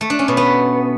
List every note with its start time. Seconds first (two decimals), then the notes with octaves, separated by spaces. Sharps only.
0.01 A3
0.10 D4
0.19 C#4
0.28 B2
0.37 B3